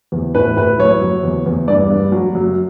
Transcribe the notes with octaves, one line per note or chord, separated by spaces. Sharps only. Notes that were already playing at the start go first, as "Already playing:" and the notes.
E2
A2 B4
A2 B4
F#2 C#5
F#2
E2
E2
G2 D5
G2
F#3
F#2